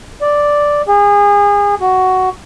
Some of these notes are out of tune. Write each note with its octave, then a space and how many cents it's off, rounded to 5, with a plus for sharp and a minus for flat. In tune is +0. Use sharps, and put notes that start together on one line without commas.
D5 +0
G#4 -30
F#4 +10